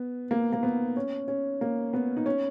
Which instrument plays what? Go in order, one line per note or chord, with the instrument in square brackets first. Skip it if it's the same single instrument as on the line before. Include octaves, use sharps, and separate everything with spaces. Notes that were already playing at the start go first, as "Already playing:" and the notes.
Already playing: [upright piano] B3
A#3
A#3
B3
C#4
C#4
A#3
B3
D#4
C#4